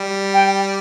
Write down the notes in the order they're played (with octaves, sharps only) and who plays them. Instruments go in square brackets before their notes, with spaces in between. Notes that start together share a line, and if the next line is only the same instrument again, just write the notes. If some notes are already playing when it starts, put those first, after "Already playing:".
Already playing: [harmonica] G3
[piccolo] G5